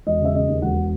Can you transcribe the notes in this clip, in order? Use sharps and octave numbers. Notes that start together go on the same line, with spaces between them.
E1 D#5
C#3
E5
C#3 D#5
D#2
E1 F#5